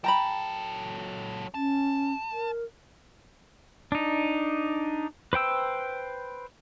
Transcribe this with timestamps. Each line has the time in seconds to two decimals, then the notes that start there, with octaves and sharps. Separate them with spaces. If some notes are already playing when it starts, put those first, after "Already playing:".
0.04 F#3 A4 G5 A#5 B5
1.54 C#4 A5
2.32 A#4
3.92 D4 D#4
5.33 B4 C5 G5 E6